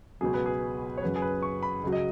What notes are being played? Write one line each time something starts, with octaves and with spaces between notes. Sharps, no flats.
C#2 B2 F#3 G#4
B4
G#4
C#5
F#2 C#3 F#3 B4
G#4
B4
C#6
B5
C#2 C#3 F#3
D#5